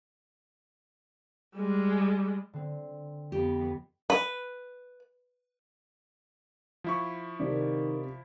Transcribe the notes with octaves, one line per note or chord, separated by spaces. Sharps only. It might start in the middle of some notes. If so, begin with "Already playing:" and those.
G3 G#3
D3 C4
F2 B3 G4
B4
F3 E4 C#6
C3 D#3 D5